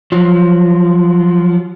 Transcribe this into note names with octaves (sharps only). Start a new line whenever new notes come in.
F3 F#3